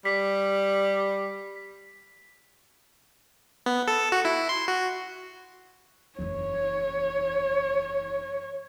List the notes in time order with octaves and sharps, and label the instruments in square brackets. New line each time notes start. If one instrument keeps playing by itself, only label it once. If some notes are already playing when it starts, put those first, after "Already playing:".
[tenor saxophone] G3 [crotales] B6
[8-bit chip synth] B3
A4
F#4
E4
C6
F#4
[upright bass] F#1 E2 [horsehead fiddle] C#5